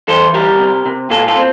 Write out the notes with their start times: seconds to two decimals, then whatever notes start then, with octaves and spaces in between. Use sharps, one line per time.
0.08 E3 A4 C5
0.34 G3 G4 A#4
0.59 C3
0.86 C3
1.10 A#2 F4 A4
1.28 F4 A4
1.36 C4